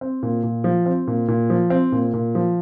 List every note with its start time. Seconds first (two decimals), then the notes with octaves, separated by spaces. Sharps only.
0.01 C4
0.23 A#2
0.43 A#2
0.64 F3
0.86 C4
1.07 A#2
1.28 A#2
1.50 F3
1.70 C4
1.92 A#2
2.14 A#2
2.35 F3